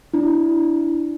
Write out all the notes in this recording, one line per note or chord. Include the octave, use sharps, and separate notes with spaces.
D4 E4